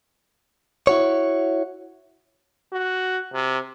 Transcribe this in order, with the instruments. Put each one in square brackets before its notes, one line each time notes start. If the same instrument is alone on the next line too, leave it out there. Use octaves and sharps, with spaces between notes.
[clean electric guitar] E4 F#4 C#5
[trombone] F#4
C3